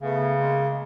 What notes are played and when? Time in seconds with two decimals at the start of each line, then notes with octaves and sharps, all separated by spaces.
0.02 C#3 A3 B3
0.36 G#3 A#3